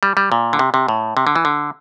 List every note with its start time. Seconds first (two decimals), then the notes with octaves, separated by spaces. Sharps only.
0.03 G3
0.17 G3
0.32 A#2
0.53 D3
0.59 C3
0.74 C3
0.88 A2
1.17 C3
1.27 D3
1.36 E3
1.45 D3